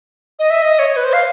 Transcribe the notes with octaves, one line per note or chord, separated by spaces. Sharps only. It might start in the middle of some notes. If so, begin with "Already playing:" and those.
D#5
E5
D#5
C#5
B4
C5
F5